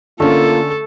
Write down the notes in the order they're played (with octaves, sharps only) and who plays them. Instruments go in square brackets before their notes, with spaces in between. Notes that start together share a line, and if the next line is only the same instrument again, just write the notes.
[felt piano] D3 C#4 [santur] A3 [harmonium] A#3 F4 [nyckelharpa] A4